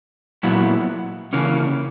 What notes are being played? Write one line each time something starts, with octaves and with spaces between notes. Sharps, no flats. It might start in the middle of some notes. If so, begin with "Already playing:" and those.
A#2 F#3 B3 E4
C#3 E3 A#3 C#4